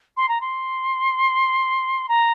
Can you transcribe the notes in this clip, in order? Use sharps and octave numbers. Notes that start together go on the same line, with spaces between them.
C6
A#5
C6
A#5